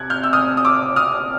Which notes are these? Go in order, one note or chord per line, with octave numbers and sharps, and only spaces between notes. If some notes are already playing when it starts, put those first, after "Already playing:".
Already playing: C3 F#6 G#6
F6 G6
E6
D#6 F6
D#6
D6 E6
D#6 F6